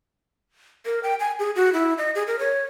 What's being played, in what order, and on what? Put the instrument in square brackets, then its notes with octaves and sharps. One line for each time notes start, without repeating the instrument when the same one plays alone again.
[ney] A#4
G5
G#5
G#4
F#4
E4
D#5
G#4
A#4
C#5